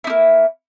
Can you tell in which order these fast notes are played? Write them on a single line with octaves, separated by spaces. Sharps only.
E4 D#4 A#3